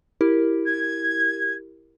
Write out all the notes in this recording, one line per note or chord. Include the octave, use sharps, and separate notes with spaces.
E4 G4 A#4
G#6